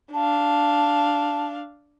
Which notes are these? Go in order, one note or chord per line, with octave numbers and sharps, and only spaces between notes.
D4 F5 A5